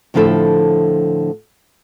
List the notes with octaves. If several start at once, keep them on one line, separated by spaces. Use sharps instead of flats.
A2 D3 F3 E4 A4 G5